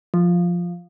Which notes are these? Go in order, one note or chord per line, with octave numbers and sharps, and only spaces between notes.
F3